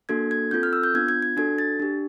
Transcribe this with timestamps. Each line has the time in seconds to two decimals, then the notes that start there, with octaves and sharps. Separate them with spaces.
0.09 A#3 D4 F#4 A4 G#6
0.31 G#6
0.51 C4 F4 A4 G6
0.63 F6
0.73 E6
0.83 G6
0.94 B3 D4 F4 G#6
1.09 G#6
1.22 G#6
1.37 D4 F#4 A4 G#6
1.58 A6
1.80 D4 G4